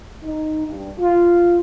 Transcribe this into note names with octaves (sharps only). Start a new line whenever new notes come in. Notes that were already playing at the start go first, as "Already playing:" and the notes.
D#4
G2
F4